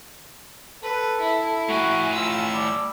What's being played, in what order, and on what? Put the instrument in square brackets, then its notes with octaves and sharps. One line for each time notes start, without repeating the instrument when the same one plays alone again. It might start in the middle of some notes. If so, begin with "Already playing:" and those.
[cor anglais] A4 [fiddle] B4
[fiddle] E4
[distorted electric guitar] A2 G#5 [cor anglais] F#4
[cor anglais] F4 [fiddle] E6
[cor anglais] G3